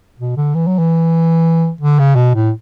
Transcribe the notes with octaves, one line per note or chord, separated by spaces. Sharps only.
B2
D3
E3
F#3
E3
D3
C#3
B2
A2